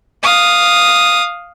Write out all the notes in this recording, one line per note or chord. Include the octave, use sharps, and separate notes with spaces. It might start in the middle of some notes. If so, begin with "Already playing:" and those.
F5 D#6